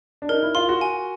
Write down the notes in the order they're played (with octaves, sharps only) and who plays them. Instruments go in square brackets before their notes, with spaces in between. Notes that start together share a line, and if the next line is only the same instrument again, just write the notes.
[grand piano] D4
[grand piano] D#4 [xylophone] A#4
[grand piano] E4
[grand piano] F4 [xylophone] C6
[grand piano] F#4
[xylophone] G#5